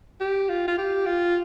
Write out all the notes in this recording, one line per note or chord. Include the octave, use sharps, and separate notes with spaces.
G4
F4
F4
G4
F4